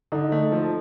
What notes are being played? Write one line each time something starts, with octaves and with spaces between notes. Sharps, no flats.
D3 D#4
A3
F3